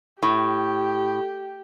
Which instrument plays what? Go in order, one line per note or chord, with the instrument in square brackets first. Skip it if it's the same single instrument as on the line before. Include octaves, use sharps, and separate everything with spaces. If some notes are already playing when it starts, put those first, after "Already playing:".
[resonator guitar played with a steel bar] A2 [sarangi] G4